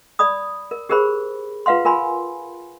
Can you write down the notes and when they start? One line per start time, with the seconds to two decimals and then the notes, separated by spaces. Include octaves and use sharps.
0.19 D5 B5 D#6
0.71 A#4
0.89 G4 G#4 A#4 C5 B5
1.66 F4 B4 F5 F#5 C6
1.85 F4 A#4 G#5 B5 C6